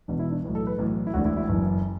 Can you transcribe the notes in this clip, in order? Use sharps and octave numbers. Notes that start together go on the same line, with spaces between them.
E1 E2 B2 D4
E4
D4
B1 A2 E3
A4
B4
B1 A2 E3
E4
E1 D2 D3 F#4
E4
E4
F#1 F#2 E3